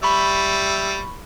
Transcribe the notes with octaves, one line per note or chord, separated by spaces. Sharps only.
G3 E5 B5 C#6